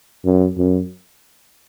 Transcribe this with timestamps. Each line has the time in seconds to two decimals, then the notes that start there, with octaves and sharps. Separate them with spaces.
0.25 F#2
0.58 F#2